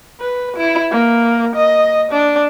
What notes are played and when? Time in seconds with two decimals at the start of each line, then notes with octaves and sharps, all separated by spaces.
0.20 B4
0.57 E4
0.91 A#3
1.56 D#5
2.12 D4